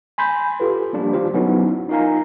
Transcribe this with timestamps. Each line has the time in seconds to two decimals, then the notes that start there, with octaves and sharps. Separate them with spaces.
0.18 G#5 B5 C6 G6
0.60 F4 G4 A4 B4
0.93 F3 G3 A#3 D4 G4
1.13 D#3 F4 G4 C5
1.34 F#3 B3 C#4 D#4 E4 F#4
1.89 D#4 F4 A#4 F5 G#5 A#5